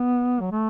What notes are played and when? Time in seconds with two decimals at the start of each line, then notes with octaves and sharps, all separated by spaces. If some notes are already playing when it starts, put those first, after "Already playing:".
Already playing: B3
0.41 F#3
0.51 A3